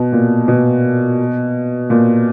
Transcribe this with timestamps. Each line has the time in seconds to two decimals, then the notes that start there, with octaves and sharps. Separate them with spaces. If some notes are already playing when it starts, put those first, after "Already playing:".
Already playing: B2
0.12 A#2
0.48 B2
1.90 A#2